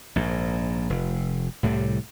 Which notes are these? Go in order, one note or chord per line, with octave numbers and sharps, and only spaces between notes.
A#1 G#2
F1
C2 A2 C3 G3